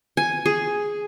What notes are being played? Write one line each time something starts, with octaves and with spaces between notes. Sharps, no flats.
G#5
G#4